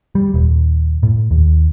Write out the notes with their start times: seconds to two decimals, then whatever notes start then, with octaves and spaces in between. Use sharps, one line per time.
0.15 G3
0.34 D#1
1.03 A2
1.31 D#2